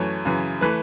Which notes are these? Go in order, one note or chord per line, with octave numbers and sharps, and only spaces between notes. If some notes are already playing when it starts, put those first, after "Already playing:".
Already playing: F#2 E3 A3 C#5
F#2 C#3 E3
E3 A3 B4